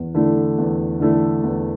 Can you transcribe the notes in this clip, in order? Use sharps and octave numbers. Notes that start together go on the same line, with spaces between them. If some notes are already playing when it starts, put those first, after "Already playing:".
Already playing: E2
D3 A3 E4
E2
D3 A3 E4
E2